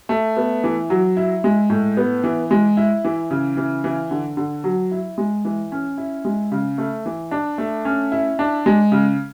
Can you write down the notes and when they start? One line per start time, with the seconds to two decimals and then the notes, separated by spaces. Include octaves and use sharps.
0.09 A3
0.37 B3
0.64 E3
0.90 F#3
1.17 E4
1.44 G#3
1.70 A2
1.97 B3
2.24 E3
2.51 G#3
2.77 E4
3.05 E3
3.31 C#3
3.57 E3
3.84 E3
4.11 D3
4.37 D3
4.64 F#3
4.91 E4
5.18 G#3
5.45 E3
5.72 C#4
5.98 E4
6.25 G#3
6.52 C#3
6.78 A3
7.06 E3
7.31 D4
7.58 A3
7.85 C#4
8.12 E4
8.39 D4
8.66 G#3
8.92 C#3